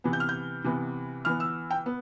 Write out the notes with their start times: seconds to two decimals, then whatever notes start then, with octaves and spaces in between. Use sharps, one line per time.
0.04 C3 E3 B3
0.13 G6
0.20 F6
0.29 G6
0.64 C3 E3 B3
1.25 E3 B3 F6
1.40 E6
1.70 G5
1.86 B3